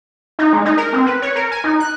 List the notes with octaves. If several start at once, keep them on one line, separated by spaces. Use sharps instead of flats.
D#4
G#3
D#4
A#4
C4
B4
C#5
A#4
G#5
D#4
F#6